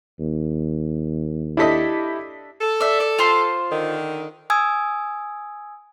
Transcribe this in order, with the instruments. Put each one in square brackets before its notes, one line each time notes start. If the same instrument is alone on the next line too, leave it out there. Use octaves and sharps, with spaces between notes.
[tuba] D#2
[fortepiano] D4 A4 D#5 [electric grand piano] E4 G4 B6
[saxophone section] A4
[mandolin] D5 E5
D5
F4 C5 C6
[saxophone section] D3 D#3
[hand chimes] G#5 D#6 E6 G#6